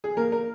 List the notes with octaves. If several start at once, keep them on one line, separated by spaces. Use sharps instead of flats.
G#4
A#3 A#4
A#4